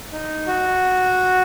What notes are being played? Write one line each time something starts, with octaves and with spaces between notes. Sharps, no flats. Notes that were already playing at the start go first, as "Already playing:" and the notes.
D#4
F#4